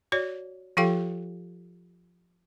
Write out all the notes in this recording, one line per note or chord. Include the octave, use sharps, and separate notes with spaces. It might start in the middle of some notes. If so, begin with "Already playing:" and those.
F#4 C#5 D5
F3 F4 G4 A4 F5 G5